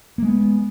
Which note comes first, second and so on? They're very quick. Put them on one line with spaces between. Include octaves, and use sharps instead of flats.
A#3 G#3 B3